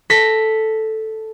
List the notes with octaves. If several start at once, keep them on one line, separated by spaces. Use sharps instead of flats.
A4 A#6 B6